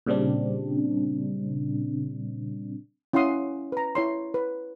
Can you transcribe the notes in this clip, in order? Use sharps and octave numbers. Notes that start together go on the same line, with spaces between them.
A#2 C#3 G3 C4 D4
C#4 E4 F5 F#5 C6 D#6
B4 A#5
E4 C#5 C6
B4